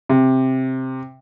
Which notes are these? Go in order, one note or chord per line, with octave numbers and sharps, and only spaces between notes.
C3